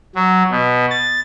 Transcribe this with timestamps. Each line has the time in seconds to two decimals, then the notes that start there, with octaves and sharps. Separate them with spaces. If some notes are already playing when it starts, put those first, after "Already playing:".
0.16 F#3
0.51 B2
0.90 A6